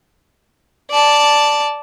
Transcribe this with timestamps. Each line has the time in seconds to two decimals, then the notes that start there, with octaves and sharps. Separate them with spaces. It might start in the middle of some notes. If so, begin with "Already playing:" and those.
0.91 D5 A5